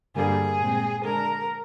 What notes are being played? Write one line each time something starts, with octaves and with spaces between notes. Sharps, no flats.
G2 D3 G3 A#3 G#4
A#2 G#3 C4
D3 G#3 D4 A#4